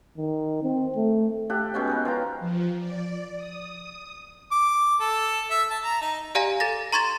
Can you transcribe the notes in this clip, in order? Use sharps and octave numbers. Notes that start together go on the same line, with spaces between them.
D#3
C4
A3
G4 A4 F#5
B2 G#3 C#4 G5
D#4 A#4 B4
F3 G5 A#5
F3
D5
D#6
D6
A4
E5
A5
A#5
D#4
G4 D5 F5 G#5 A#5 A#6
A4 A6 A#6
A#5 C6 C#6 G#6 A6 E7